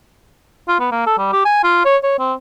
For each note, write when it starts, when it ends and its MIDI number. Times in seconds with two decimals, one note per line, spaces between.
0.68 0.75 65
0.80 0.91 59
0.91 1.03 58
1.07 1.14 69
1.18 1.29 55
1.33 1.41 67
1.45 1.59 80
1.64 1.83 65
1.85 1.97 73
2.03 2.19 73
2.19 2.34 60